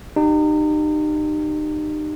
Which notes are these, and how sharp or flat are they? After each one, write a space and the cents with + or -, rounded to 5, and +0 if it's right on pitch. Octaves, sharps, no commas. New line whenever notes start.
D#4 -35 G4 -15